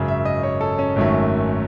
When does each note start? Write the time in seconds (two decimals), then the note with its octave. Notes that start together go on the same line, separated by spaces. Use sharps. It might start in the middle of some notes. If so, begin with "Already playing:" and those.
Already playing: G#1 F#2 C#3
0.08 E5
0.25 D#5
0.43 C#5
0.61 A4
0.79 C#4
0.96 G#1 F#2 D#3 F#3 A3